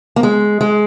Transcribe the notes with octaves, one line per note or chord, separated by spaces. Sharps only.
A#3
G#3
G#3